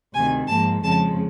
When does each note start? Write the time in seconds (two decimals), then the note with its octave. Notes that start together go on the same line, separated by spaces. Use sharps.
0.13 D2 C3 D#3 G#5
0.47 G#2 F3 A#3 A5
0.83 F2 C#3 F3 G#3 A5